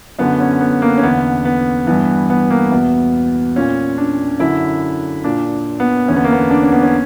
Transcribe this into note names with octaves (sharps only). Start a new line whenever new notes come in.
F#2 D3 B3
C#4
B3
A#3
C#4
E2 D3 B3
B3
G2 E3 B3
B3
A#3
E2 B2 B3
A#2 C#4
D4
F#2 D3 E4
A#2 D4
B3
E2 D3 C#4
B3
A#3
B3
D4
C#4
B3
C#4